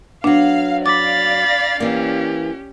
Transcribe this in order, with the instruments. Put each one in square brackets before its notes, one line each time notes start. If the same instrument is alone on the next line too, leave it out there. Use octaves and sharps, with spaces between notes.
[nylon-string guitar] F#3 B3 [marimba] D4 [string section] F5
[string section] D5 F5 [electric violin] B5 A6 [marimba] D6
[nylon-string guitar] E3 A#3 [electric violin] C#4 G4